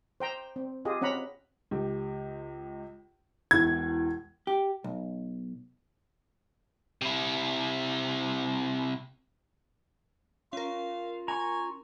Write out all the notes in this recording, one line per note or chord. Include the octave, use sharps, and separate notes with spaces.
C5 G5 A#5
C4
F4 G4 G#4 D#5
C4 C#4 F#5 A#5 B5
C#2 G4
E1 E2 G#6
G4
B1
C3 E4
C#4 F4 A#4 F5
G#5 A#5 C#6